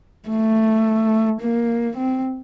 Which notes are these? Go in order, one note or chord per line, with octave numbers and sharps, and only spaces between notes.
A3
A#3
C4